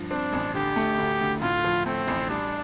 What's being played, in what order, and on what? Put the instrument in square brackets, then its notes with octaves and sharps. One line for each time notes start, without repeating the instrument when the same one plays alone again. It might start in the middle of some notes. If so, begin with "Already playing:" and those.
Already playing: [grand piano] G2 F3
[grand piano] C4 [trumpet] D4
[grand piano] A1
[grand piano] D3 [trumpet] G4
[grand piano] A3
D2
D2
[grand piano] A2 [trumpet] F4
[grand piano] F3
[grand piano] A3 [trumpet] C4
[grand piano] A1
[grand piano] G3 [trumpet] D4